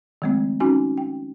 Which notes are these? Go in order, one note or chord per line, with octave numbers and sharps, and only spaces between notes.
D#3 F3 G#3 A3 C4
C#4 D#4 F#4 G#5
G5